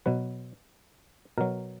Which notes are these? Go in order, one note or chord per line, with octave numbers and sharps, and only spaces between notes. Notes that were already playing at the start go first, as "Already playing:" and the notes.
B2 F#3 B4
B2 F#3 A#4